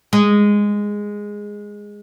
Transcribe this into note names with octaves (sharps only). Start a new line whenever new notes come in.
G#3